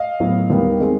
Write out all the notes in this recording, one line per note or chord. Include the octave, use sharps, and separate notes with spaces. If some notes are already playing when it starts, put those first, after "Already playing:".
Already playing: D#5 F5
A2 F#3 B3
D#2 D#3 G3 B3
D#3 G#3 C4